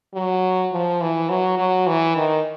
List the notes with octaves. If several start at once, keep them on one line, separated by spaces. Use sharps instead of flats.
F#3
F3
E3
F#3
F#3
E3
D#3